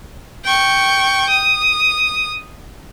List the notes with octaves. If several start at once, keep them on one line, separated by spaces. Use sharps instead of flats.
G5 C#6
D#6